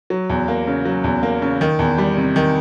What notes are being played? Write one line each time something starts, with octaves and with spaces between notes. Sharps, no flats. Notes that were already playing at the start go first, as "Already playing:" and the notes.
F#3
E2
A#3
C#3
F#3
E2
A#3
C#3
D#3
E2
G3
C3
D#3